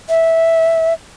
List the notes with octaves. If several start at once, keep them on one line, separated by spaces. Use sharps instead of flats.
E5